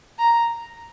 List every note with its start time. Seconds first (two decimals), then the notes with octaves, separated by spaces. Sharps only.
0.19 A#5